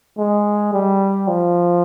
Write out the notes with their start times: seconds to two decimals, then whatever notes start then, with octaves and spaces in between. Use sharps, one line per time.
0.18 G#3
0.73 G3
1.28 F3